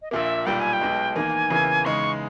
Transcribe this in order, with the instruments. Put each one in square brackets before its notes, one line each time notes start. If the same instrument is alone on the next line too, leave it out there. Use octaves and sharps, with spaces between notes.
[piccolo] D#5
[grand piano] A#1 A#2 A#3 [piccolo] E5
[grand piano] B1 A#2 G3 [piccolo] G5
[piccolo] G#5
G5
[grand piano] B1 B2 G#3
[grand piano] E2 D#3 A#3 [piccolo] G#5
[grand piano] E2 C#3 E3 A#3 E4
[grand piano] E2 C#3 G#3 D#4 [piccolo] C#6